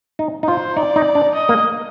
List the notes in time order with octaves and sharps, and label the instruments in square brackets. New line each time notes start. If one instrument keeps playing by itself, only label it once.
[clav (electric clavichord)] D#4
D#4
[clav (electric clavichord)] F4 [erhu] C5
[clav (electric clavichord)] D#4 [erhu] D5
[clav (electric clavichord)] D#4
D4
[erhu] D#5
[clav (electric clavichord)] A#3